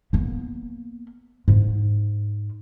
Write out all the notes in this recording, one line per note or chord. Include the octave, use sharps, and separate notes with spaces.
A#3 B3
G#2